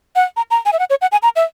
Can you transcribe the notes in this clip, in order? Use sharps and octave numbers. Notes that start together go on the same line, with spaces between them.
F#5
A#5
A#5
G#5
E5
F#5
C#5
F#5
G#5
A#5
E5